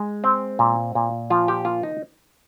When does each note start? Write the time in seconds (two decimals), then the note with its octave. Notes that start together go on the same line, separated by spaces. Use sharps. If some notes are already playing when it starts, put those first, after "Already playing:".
Already playing: G#3
0.24 C4
0.59 A#2
0.95 A#2
1.30 F3 F4
1.48 G4
1.65 A#3 F4
1.83 D#4